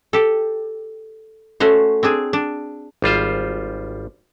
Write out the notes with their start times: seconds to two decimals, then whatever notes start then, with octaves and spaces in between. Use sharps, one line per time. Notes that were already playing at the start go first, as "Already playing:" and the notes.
0.13 G4 A4
1.60 A3 C#4 F#4 C5
2.03 C4 D4 G#4
2.33 D4
3.02 G#1 G3 F4 C5